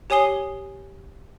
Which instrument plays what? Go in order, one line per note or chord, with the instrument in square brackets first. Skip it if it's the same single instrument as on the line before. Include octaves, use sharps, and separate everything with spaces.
[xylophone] G4 C#5 G#5 D#6 C7 G7